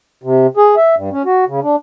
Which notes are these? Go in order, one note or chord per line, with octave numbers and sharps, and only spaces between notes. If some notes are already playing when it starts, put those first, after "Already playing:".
C3
G#4
E5
G2
C#4
F#4
C#3
D4